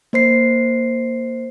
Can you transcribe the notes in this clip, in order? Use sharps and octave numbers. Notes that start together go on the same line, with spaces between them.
A#3 C5 C7